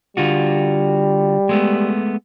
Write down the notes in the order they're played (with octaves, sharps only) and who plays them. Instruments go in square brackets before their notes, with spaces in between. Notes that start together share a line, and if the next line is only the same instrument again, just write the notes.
[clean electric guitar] D3 F4 F#4 [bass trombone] G3
[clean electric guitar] G#3 A3 B3